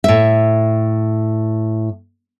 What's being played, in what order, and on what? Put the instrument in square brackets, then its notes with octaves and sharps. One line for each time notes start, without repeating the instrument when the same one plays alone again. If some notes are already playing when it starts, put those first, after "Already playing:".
[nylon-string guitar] A2 E5